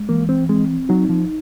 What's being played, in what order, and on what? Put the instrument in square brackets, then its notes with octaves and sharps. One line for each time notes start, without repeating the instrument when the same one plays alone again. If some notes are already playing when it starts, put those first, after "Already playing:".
Already playing: [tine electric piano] G#3
[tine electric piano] E3 [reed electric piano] A#3
[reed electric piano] C4
[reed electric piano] G#3 [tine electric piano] C4
[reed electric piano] F#3 [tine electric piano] D#4
[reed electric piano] F3